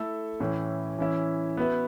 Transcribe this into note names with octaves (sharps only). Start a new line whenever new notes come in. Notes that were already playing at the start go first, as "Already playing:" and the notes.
Already playing: A3 E4 A4 E5
A2 E3 C#4 E4
E3 C#4 E4
B3 F#4 B4 E5